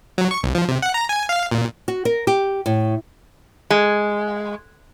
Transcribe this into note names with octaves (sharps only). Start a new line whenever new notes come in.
F#3
C#6
C2
F3
C3
F#5
A#5
G#5
F5
A#2
F#4
A#4
G4
A2
G#3